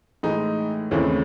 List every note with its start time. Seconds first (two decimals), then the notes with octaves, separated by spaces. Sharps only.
0.23 A2 E3 G#3 D#4
0.91 D#2 C#3 E3 A3 C4 C#4